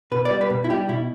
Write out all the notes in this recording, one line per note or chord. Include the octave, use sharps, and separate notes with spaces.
B2 B4
D5
G3
B4
B2
E4
G3 G4
B2 E4